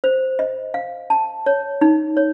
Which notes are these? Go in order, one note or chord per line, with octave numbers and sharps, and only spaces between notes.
C5
D#5
F5
A5
C#5
D#4
C#5